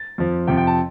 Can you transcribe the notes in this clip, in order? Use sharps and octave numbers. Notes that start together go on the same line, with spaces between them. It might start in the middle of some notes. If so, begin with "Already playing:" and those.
Already playing: A6
F2 F3
F2 C3 F3 G5
G5
A5